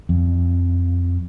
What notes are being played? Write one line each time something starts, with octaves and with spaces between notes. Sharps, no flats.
F2